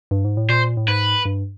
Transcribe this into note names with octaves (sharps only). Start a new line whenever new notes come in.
G2
G#2
A2
A#2 C5
A2
G#2 B4
G2